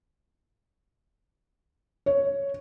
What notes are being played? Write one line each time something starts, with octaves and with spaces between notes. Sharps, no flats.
C#5